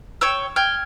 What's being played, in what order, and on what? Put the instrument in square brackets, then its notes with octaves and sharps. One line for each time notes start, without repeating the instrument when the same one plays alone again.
[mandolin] C#5 G5 E6
[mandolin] G5 [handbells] F6 G#6